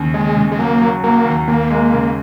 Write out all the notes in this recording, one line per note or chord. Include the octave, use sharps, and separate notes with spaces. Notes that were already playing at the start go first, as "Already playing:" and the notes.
Already playing: D#2 C#3
D#2 G#3
C#3
G#3
F#3 A#3
F#3
F#3 A#3
D#2
D#2 A#3
G#3
C#3